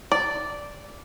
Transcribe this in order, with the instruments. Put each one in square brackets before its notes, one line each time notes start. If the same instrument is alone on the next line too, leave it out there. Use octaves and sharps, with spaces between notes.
[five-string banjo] D5